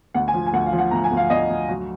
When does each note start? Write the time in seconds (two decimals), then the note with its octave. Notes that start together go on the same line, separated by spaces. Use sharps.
0.14 D2 F#5
0.28 G#5
0.34 F3
0.46 G#5
0.53 D2 F#5
0.66 F5
0.73 F3
0.79 F#5
0.91 D2 A#5
1.04 G#5
1.12 D2
1.17 F5
1.30 D2 D#5
1.50 D2
1.69 F#3